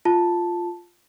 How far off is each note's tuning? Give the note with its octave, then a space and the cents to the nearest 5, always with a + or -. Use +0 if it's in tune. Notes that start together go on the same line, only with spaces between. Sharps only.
F4 +0 A5 +0